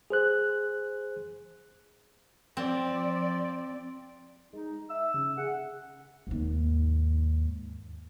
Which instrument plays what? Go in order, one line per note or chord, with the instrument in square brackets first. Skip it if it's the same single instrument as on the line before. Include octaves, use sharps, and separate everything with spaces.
[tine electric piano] G#4 C5 F#6
[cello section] F3 D5 [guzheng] C4
[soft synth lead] G#3 [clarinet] D#4
[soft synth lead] E5 [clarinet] E6
[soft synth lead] C#3
[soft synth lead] G#4 [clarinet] F#5
[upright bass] D#2 G#2